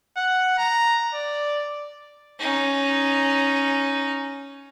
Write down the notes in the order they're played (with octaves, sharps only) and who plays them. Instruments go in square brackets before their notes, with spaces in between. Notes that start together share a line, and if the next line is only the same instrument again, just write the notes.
[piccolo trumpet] F#5
A#5
D5
[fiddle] C#4 D#4